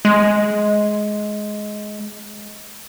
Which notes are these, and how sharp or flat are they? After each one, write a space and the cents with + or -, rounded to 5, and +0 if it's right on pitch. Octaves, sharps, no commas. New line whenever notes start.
G#3 +15